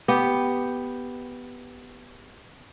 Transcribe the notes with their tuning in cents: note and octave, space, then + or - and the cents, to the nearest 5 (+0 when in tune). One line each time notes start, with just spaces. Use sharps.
B3 +0 G4 +0